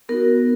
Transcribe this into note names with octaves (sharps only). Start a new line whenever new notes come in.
B3 D#4 F#4 A#4